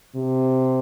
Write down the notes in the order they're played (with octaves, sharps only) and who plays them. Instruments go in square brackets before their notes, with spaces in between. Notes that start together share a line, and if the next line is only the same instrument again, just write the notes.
[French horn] C3